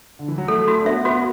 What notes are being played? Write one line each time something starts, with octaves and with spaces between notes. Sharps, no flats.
D3
E3
F#3
A3 A4
A3 F#4
D4
B3 E5
B3 F#4